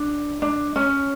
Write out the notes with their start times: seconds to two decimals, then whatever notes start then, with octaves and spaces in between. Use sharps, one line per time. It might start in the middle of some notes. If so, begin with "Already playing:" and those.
Already playing: D4
0.42 D4
0.76 C#4